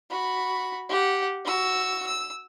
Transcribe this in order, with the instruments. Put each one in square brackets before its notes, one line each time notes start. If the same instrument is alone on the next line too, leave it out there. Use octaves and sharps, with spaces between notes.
[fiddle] F#4 B5
G4 F#5
F#4 E6
E6